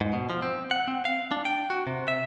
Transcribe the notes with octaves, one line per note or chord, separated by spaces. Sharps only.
G#2
B2
F3
C4
F#5
C4
F5
D4
G5
F#4
C3
E5